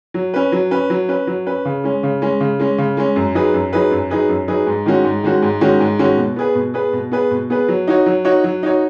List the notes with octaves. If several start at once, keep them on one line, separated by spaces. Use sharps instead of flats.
F#3
C#4 B4
F#3
C#4 B4
F#3
C#4 B4
F#3
C#4 B4
C#3
G#3 C#4
C#3
G#3 C#4
C#3
G#3 C#4
C#3
G#3 C#4
F#2
F#3 D#4 G#4 B4
F#2
F#3 D#4 G#4 B4
F#2
F#3 D#4 G#4 B4
F#2
F#3 D#4 G#4 B4
G#2
D#3 G#3 C#4 F#4
G#2
D#3 G#3 C#4 F#4
G#2
D#3 G#3 C#4 F#4
G#2
D#3 G#3 C#4 F#4
B2
B3 G#4 B4
B2
B3 G#4 B4
B2
B3 G#4 B4
B2
B3 G#4 B4
F#3
D#4 F#4 C#5
F#3
D#4 F#4 C#5
F#3
D#4 F#4 C#5